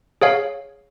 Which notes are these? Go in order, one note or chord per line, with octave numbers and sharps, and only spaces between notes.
G#4 C#5 F5